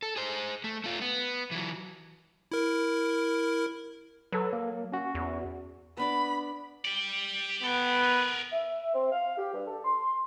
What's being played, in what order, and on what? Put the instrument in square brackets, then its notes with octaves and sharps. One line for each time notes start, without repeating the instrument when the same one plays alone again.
[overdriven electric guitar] A4
G#4 C5
A3
A3 F4
B3
E3 F#3
[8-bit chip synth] E4 A#4
[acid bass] F#3 [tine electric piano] A4 B4
[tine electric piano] A#3
C#4 F#4
[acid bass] E2
[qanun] B3 D4 D5 [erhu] B5
[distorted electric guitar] G4 D5
[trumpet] B3 [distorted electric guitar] A4 G5
[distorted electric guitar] A#4 B4
[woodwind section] E5
C4
F5
G4
G2
A4
C6